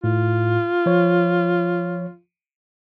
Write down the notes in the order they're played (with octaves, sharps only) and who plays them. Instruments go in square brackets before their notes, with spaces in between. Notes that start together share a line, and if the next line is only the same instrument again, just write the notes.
[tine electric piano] A2 [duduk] F4
[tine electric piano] F3 C#5